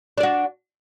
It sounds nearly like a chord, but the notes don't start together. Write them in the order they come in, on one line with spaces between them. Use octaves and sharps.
D4 D5 F#4